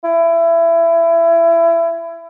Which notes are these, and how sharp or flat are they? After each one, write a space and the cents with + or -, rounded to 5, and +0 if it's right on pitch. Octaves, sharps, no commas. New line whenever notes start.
E4 +25